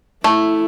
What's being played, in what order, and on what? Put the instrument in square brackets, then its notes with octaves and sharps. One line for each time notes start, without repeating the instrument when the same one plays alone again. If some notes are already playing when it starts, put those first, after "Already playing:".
[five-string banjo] A3 [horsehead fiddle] E4